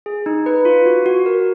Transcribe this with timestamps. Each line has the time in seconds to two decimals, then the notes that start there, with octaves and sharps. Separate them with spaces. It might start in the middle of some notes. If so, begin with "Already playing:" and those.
0.06 G#4
0.26 D#4
0.46 B4
0.65 F4
0.86 F#4
1.06 F#4
1.26 A#4